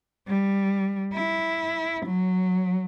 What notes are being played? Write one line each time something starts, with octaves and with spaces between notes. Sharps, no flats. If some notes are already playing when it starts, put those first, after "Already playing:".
G3
E4
F#3